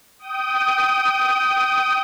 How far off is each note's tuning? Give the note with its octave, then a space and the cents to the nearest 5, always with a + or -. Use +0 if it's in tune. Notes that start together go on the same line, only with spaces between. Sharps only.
G5 -25 D#6 +0